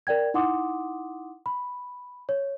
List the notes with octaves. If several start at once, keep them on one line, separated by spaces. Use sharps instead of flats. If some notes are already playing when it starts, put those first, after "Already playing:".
A#4 D5 G5 G#6
D#4 E4 F#5 C6 D6 D#6
B5
C#5